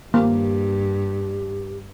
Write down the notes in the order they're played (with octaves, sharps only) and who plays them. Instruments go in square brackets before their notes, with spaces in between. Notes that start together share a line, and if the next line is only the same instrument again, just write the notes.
[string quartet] G2 [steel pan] A#3 [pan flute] G4